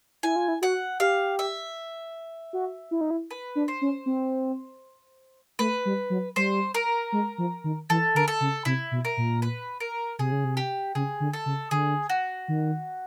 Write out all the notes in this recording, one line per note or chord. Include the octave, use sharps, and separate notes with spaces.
E4 G#5
F4
E4
F#4 F#5
G4 F5
E5
F#4
E4
D#4
E4
B4
D4
C5
C#4
C4
A3 B4
G3
F#3
G3 C5
A#4
G#3
F3
D#3
E3 A4
D3 A#4
A4
C#3
C3 E4
B2
A#4
A#2
B4
A#4
C3 G#4
C#3
C3
G4
C#3 G#4
D3
A4
C#3
D3 G#4
F#4
D#3